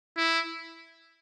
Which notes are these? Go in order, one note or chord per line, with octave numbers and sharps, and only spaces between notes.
E4